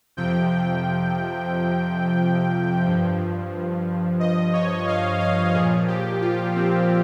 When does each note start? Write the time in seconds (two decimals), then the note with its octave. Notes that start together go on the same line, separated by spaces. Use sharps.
0.17 F2 C3 F3 G5
2.85 G2 F3
4.20 D#5
4.53 C#5
4.87 F5
5.20 F5
5.54 A#2 F3 G#4
5.88 G4
6.21 F4
6.55 C4